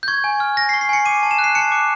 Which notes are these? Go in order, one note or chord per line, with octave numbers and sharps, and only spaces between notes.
G6
C#6 G#6
G#5
F6
G#5 A#6
C7
C#6
C7
G#5 C#7
D6 D#7
A5
E7
F#6
C7
A5 C#7
D6